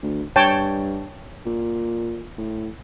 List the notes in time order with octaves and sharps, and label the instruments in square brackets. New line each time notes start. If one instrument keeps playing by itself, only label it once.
[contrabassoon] D2
[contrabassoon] G2 [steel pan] C#5 G5 A5
[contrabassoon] A#2
A2